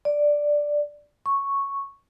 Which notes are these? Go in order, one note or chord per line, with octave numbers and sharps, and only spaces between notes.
D5
C#6